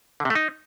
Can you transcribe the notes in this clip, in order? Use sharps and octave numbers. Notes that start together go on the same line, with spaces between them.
D3
C3
A3
D#4